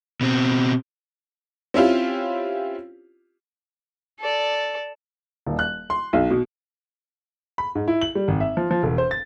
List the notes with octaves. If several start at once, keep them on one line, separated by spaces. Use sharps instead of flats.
B2 C4
C4 C#4 E4 F4 G4
A4 D5
D#1
F#6
C6
B1
B2
B5
G#2
E4
F#7
G3
G#1
E5
F3
F3
E1
C5
A6